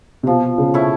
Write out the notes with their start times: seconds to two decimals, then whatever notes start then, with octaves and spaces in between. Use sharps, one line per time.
0.23 C3
0.27 B2 F3
0.58 C#3
0.74 A3 C#4 E4